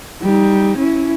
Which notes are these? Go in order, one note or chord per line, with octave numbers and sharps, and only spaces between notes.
G3 D#4
C#4 E4